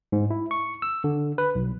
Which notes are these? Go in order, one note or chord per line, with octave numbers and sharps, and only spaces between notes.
G#2
E4
C#6
E6
D3
B4
B1